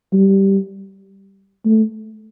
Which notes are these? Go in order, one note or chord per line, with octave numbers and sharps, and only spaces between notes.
G3
A3